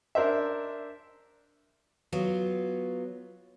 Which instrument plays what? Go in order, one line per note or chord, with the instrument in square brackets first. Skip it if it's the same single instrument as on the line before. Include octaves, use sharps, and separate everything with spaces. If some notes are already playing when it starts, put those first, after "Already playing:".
[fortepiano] D4 A#4 C5 E5
[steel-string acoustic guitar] F#3 B3 F4